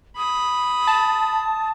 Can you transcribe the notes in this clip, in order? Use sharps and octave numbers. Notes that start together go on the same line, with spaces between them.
B5 D#6
A5